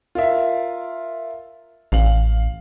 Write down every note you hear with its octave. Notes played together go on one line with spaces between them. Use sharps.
F4 A#4 E5
A1 F5 F#7